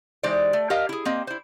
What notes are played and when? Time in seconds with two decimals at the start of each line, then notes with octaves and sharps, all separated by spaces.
0.23 E3 G#3 D#4 G4 C5 D5
0.53 A3
0.70 G4 A#4 D#5 F5
0.89 E4 G#4
1.05 A#3 C4 D#5
1.27 E4 C5